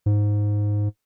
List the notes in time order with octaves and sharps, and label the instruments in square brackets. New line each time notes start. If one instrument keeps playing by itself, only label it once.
[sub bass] G#2